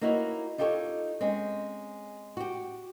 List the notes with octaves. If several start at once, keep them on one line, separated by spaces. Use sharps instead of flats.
A#3 D#4 E4 F#4 C#5
D#4 F4 G4 A4 C5 C#5
G#3 C4 C#4
F#4 G4